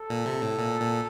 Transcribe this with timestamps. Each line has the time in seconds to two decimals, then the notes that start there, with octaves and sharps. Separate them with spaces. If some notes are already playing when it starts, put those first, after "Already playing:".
Already playing: A4
0.10 A#2
0.26 C3
0.42 A2
0.59 A#2
0.81 A#2